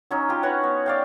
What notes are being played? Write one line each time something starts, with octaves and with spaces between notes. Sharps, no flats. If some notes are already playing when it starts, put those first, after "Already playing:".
F#3 C#4 D#4
F4 G4
F#4 B4 C#5 F#5
B3
D5 F5 G5